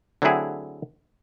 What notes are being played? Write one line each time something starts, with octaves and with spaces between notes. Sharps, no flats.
D3 F#3 A3 C4 E4 G#4